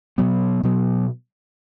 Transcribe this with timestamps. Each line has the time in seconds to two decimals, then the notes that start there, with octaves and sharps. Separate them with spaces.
0.18 B2 F#3 B3
0.63 B2 F#3 B3